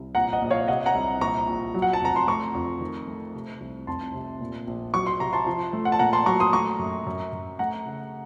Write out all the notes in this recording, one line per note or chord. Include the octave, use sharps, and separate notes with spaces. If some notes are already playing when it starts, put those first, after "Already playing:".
Already playing: C2
A#1 F#5 A#5
D#5 F#5
A#1
C#5 F5
C3 D#5 F#5
F#5 A#5
C2
A#1 A#5 C#6
A#1
F#3
F#5
A5
F1 A#5
C6
A3 A#5 C#6
F2
D#3
A3
C3
C2
F1 A5 C6
C3
A#2
A#1
F#3 C#6
C6
C3 A#5
A5 C6
F3
A3
F#5
A5
A#2 F#5 A#5
A5 C6
F#3 A#5 C#6
C6 D#6
A3 A#5 C#6
F#2
F#2
F#2
A3 F#5 A#5
C#3